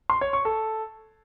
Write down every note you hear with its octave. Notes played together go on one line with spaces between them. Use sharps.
C6
C#5
C#6
A4